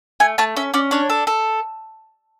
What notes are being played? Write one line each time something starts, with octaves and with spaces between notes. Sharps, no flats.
A3 G#5
A3 A5
C#4 E5
C#4 D5
D4 C#5
A4
A4